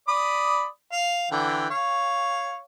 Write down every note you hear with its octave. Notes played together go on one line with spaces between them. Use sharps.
D5 B5 D#6
F5
D3 E3 G5
C#5 F5